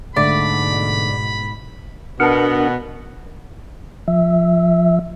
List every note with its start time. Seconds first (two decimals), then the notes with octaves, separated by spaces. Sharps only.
0.16 G#2 B2 D3 A3 D5 F5 B5
2.20 B2 B3 D4 A#4 F#5
4.08 F3 E5